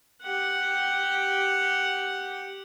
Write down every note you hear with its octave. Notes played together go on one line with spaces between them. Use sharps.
G4 F#5